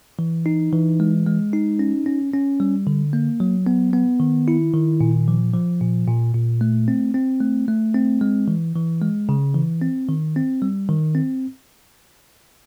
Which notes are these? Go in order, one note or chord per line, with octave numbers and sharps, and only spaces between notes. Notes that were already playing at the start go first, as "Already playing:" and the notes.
E3
D#4
E3
G#3
G#3
D#4
C#4
C#4
C#4
G3
D3
A#3
F#3
B3
B3
D#3
E4
D#3
A#2
F3
F3
A#2
A#2
A#2
A3
C4
C4
A3
A3
C4
G#3
E3
E3
G#3
C#3
E3
C4
D#3
C4
G3
D#3
C4